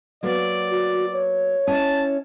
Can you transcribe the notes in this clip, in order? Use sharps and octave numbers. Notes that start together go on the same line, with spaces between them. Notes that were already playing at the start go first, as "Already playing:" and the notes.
F#3 A#3 B3 D5
F#4
C#5
C#4 E4 D#5 A5